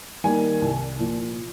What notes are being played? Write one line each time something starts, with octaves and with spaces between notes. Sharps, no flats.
D#3 G3 A#3 G#5
C2
A#2 F3